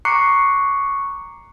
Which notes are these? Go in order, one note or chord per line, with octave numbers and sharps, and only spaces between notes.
A#5 C#6 D6 F#6 C7 C#7